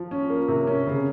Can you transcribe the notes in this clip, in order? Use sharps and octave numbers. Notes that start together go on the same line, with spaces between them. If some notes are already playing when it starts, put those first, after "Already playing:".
Already playing: F3
C#4
A#3
C3
C#4
C#3